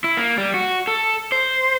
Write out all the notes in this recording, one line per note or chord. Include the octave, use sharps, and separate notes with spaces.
E4
A#3
G3
F#4
A4
C5